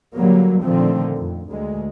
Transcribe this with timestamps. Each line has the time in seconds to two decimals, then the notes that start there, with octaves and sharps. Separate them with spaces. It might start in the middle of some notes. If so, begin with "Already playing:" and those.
0.15 D3 F#3 G3 A#3
0.64 A#2 D3 D#3 F3 A3 C4
1.16 F2
1.49 D2 G#3